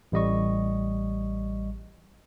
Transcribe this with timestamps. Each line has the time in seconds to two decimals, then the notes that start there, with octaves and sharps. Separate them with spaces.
0.12 A1 G3 D#5 C#6